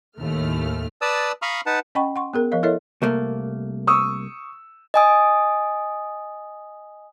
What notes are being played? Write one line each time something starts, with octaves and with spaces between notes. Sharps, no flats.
D#2 A2 A3 F6
B4 D5 A5 D#6 E6
F5 A#5 B5 C#6 D#6 F6
D#4 B4 F#5 A5
C#4 D#5 F#5 G5 B5 C#6
F#5 C6 C#6
B3 G#4 A#4
F3 A#4 D#5 F5
E4 A4 A#4 C#5 D#5 E5
C2 A3 A#3
C#6 D#6 E6
D#5 G#5 D#6